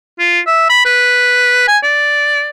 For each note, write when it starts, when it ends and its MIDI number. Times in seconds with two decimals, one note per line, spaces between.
0.19 0.40 65
0.47 0.68 76
0.70 0.85 83
0.85 1.66 71
1.68 1.78 80
1.83 2.50 74